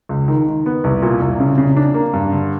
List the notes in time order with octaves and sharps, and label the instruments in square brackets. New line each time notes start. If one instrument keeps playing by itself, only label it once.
[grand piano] C#2
D#3
D#3
B3
C2
A#2
C2
C#3
C#3
D4
A#3
G2
D3